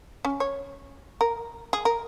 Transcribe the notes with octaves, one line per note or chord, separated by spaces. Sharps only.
C#4
C#5
A#4
G#4
A#4